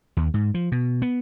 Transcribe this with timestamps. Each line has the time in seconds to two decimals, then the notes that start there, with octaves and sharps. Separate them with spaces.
0.17 D#2
0.34 G#2
0.54 F3
0.72 B2
1.02 B3